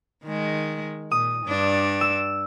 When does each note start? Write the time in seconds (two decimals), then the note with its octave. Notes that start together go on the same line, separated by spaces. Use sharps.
0.24 D#3 G#3
1.11 A#2 D#6
1.46 G2 D4
2.01 E6